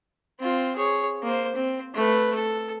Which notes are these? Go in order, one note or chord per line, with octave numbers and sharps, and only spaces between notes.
C4 F4
G#4 C#5
A#3 C5
C4
A3 B4
A4